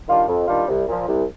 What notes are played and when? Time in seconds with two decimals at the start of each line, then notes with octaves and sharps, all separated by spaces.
0.08 D#3 G3 D4 F4
0.28 F2
0.48 D#3 G3 D4 F4
0.68 C2
0.88 A#2 F3
1.08 C2